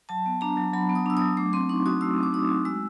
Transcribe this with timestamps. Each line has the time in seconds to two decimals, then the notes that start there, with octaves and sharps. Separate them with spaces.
0.09 F#3 A5
0.26 B3
0.41 D4 A#5
0.57 F#3
0.73 F#3 B5
0.89 B3
0.95 D#6
1.06 D4 E6
1.17 F#3 D#6
1.37 A3 D6
1.53 C4 C6
1.69 D#4 C#6
1.86 F#4 D#6
2.01 A3 E6
2.18 C4
2.23 D6
2.33 D#4 D#6
2.50 F#4
2.65 G#3 E6